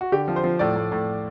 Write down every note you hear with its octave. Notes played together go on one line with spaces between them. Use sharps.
F#4
D3 G4
F3
C5
F3
A2 D5
A2
A2